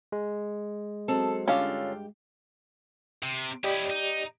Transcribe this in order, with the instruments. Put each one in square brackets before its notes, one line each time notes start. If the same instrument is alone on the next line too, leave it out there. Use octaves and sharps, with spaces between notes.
[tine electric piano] G#3
[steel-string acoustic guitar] F#3 C4 D#5 [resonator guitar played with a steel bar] A4
[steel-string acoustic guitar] G2 G4 [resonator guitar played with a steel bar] D3 F4 [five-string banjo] C#4 F5
[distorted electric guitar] C3
[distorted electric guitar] C#4 E4 [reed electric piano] G4 D5 D#5
[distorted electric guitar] D#4